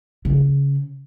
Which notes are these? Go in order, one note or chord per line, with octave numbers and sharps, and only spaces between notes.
C#3